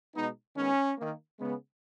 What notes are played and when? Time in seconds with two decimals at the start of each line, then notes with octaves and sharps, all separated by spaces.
0.15 B2 G#3 B3 D#4
0.56 D#3 G#3 B3 C#4
0.97 D#3 A#3
1.39 C#3 G#3 B3